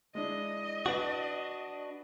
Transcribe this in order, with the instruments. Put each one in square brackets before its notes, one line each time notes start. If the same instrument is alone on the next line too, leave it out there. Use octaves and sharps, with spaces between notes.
[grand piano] G#3 D4 E4 [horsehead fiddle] D#5
[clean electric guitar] D4 F#4 [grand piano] B4 D5 A5